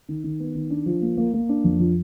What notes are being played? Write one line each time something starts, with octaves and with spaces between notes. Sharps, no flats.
D#3
D#3
B3
D#3
D4
F3
A#3
A#3
A#3
D4
F2
F3